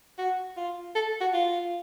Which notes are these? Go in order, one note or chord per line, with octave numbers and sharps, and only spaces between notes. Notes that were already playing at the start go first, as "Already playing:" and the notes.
F#4
F4
A4
F#4
F4